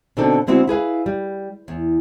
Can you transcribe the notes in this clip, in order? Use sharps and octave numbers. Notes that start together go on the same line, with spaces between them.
B2 D3 C4 D4 D#4 A4
D3 G#3 B3 C4 E4 F#4
E4 G#4 B4 F5
G3
E2